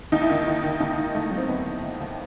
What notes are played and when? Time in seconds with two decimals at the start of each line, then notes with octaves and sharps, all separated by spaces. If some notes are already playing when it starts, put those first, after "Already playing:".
0.12 D#2 D#4
0.22 E4
0.30 D#3 D#4
0.46 D#3 E4
0.63 D#3
0.80 D#2 D#4
0.97 D#2
1.15 D#3 A3
1.31 F#3
1.38 C4
1.48 D#2 B3
1.66 D#2
1.83 D#2
2.00 D#2